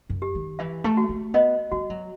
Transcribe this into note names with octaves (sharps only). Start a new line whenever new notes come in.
F#2
G4
D#3
E3 E5
A3
F#4
A3
B3 D#5
G3 F#4
F#3